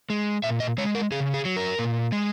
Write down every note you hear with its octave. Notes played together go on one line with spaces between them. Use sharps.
G#3
A#2 E5
D#5
G#3 C#5
A#4
C#3 G#4
G#4
F#3
A#4
A#2
G#3